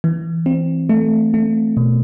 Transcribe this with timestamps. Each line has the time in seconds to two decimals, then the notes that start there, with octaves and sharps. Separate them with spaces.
0.04 E3
0.46 C4
0.89 A3
1.34 A3
1.77 B2